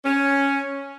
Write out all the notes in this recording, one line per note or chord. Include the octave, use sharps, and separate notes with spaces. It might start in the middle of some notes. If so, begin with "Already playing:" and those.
C#4